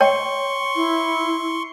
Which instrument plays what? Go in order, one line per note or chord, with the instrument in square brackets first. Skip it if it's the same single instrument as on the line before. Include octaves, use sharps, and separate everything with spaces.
[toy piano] C#5 G5 [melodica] C6 C#6
[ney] E4